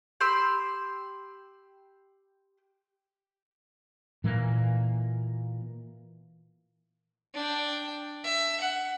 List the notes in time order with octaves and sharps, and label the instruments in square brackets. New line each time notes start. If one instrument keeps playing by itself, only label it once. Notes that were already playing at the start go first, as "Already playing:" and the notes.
[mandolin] G4 B5 C6 E6
[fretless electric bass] A#2 E3 A#3
[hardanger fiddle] D4 G5
E5
F#5